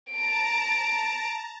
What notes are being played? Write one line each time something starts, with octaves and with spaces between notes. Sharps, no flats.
A5 A#5 D7